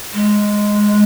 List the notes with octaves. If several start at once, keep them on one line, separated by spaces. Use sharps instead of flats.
G#3